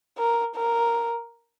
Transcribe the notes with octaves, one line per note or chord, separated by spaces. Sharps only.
A#4
A#4